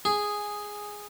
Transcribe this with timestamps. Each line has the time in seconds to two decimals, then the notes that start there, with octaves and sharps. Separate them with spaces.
0.05 G#4